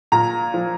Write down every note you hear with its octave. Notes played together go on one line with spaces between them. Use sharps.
A#2 A#5
F3